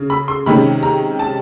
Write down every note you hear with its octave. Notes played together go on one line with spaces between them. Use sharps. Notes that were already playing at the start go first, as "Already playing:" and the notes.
Already playing: C#3
B5
C6
C3 D#3 G#3 C#4 B5
A#5
A5